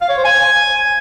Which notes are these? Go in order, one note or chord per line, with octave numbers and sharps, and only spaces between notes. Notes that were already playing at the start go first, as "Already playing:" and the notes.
F5
C#5
C5
G#5